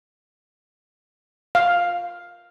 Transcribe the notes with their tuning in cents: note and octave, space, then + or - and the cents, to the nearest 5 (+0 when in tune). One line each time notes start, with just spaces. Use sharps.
F5 +5